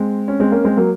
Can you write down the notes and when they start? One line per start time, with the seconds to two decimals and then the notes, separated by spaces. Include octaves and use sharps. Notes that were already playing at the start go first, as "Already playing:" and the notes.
Already playing: G#3 C4
0.28 C#4
0.40 G#3 C4
0.52 A#3 C#4
0.64 G#3 C4
0.77 F#3 A#3